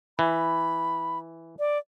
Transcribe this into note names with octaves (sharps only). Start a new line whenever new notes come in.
E3 B5
D5